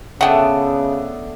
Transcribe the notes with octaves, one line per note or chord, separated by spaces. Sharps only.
C#3 A3 B3 D4 F#5 G5